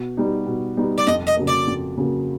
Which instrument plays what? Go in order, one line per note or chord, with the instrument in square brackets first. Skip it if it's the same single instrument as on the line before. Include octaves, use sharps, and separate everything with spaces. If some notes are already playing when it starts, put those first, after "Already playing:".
Already playing: [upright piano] B2
G3 B3 D#4
B2
G3 B3 D#4
[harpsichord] D5
[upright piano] F2 [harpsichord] D#5
[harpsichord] D#5
[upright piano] C#3 F#3 A#3
[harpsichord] D5
[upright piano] F2
C#3 F#3 A#3